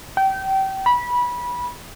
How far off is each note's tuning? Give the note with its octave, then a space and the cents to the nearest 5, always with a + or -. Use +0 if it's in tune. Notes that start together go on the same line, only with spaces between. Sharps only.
G5 -30
B5 -20